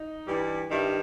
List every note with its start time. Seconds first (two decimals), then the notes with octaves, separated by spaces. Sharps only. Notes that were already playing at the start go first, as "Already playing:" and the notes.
Already playing: D#4
0.27 G2 E3 G3
0.70 G2 D#3 G3 E4